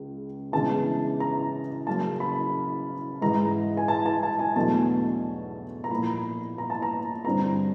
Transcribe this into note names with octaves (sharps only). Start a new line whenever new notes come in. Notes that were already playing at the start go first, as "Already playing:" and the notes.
Already playing: C#2 C#3
C#3 E3 G#3 B3 D4 A5
A#5
C#3 F#3 A#3 A5
B5
G#2 E3 G#3 A#5
G#5
A5
A5
A5
G#5
E2 B2 F#3 A3 D4 A5
A#5
A#2 F3 A#3 B5
A#5
A5
A#5
G2 D3 G3 C4 A#5